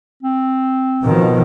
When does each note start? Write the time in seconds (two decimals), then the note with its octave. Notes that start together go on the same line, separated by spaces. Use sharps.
0.23 C4
1.03 B2 D#3 F3